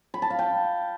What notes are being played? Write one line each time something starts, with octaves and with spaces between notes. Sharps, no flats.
B5
A5
F5
G5